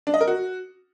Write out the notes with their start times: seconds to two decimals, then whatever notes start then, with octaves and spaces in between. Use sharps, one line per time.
0.07 D4
0.14 D#5
0.21 A#4
0.27 F#4